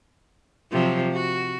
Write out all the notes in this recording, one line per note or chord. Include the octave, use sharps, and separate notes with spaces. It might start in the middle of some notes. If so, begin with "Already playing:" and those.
C3 F3 F#3
F#4